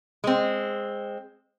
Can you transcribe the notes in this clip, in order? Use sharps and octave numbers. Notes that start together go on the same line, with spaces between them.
G#3 C4